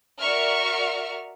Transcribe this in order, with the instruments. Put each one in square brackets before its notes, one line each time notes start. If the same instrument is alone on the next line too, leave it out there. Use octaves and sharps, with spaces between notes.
[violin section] F#4 A#4 D5 E5 C#6 F6